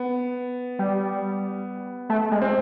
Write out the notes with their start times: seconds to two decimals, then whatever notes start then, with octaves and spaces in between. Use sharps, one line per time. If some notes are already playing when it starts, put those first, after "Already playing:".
Already playing: B3
0.79 G3
2.09 A3
2.31 G#3
2.42 C4